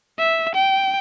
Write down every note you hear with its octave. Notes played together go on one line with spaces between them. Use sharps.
E5
G5